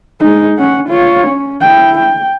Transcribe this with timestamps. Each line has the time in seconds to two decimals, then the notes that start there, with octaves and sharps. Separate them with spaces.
0.20 G#3 D#4
0.58 C#4 F#5
0.89 F4 C#5
1.27 C#4
1.61 E4 G5
1.98 G5